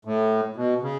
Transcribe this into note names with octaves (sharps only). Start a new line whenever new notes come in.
A2
B2
C#3